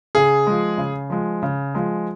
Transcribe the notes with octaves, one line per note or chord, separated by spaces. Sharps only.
C#3 G#4
F3 G#3
C#3
F3 G#3
C#3
F3 G#3